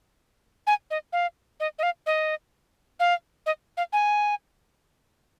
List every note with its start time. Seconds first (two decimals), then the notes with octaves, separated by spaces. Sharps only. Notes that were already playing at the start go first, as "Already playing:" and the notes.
0.67 G#5
0.91 D#5
1.13 F5
1.60 D#5
1.79 D#5
1.83 F5
2.06 D#5
3.00 F5
3.46 D#5
3.77 F5
3.93 G#5